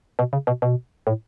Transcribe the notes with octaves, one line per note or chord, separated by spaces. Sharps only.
B2
C#3
B2
B2
A2